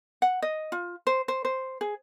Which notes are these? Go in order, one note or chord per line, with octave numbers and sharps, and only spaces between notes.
F#5
D#5
F4
C5
C5
C5
G#4